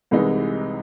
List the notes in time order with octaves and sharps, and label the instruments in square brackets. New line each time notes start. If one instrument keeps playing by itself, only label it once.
[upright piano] C2 C3 E3 G#3 D#4